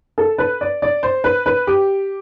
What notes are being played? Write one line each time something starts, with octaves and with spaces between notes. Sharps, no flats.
A4
B4
D5
D5
C5
B4
B4
G4